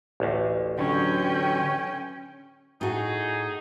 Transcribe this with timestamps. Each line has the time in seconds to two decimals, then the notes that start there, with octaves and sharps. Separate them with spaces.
0.20 A1 D2
0.79 D3 F#3 C#4 G5
2.81 A2 D#4 F#4 G#4